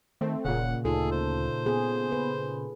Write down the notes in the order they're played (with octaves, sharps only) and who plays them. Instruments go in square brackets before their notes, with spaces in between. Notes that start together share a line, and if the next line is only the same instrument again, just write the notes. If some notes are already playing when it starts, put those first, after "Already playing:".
[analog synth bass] D#3 [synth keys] A3 C4
[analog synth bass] D#1 [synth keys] A#2 C#3 [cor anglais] F#5
[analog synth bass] D2 [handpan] D#4 F4 A4 [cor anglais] G#4
[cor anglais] C5
[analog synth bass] B3 [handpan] G#4
[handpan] B4